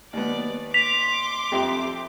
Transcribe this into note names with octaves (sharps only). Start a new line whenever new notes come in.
D#2 B3 D5
C6 D6 B6 F7
F2 G4 E5